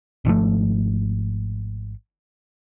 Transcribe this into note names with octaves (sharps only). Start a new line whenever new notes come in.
G#1 G#2 F3 A3